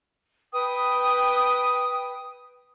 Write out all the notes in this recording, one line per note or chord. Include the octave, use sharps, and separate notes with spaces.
B4 G5 D#6